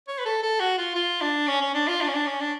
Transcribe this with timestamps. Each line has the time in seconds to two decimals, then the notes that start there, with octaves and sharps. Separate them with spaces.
0.08 C#5
0.18 B4
0.25 A4
0.43 A4
0.60 F#4
0.78 F4
0.96 F4
1.21 D4
1.48 C#4
1.61 C#4
1.74 D4
1.88 F4
2.01 D4
2.07 C#4
2.14 D4
2.26 C#4
2.40 D4